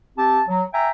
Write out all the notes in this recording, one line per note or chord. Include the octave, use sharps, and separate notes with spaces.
C4 G4 A5
F#3
E5 G5 G#5 A#5